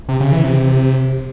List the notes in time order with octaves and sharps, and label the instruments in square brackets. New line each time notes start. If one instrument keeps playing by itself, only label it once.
[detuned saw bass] C3
C#3
E3
C3